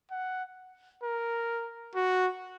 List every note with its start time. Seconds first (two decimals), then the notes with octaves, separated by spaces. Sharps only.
0.11 F#5
1.03 A#4
1.95 F#4